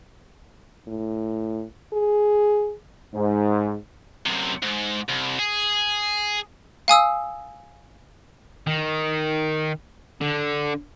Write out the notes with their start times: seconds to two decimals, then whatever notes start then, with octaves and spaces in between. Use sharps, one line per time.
0.88 A2
1.93 G#4
3.14 G#2
4.26 F#2 C3
4.63 G#2
5.09 C2
5.39 G#4
6.88 F5 G#5 D#6 E6
8.67 D#3
10.21 D3